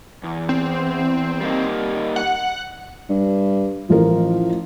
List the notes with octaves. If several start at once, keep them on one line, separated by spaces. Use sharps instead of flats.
E2
C4
G3 A#3 D#4
F#5
G2
A1 F3 A#4